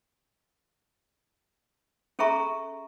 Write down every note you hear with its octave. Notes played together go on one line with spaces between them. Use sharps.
C#4 G#4 A4 E5 A#5 C#6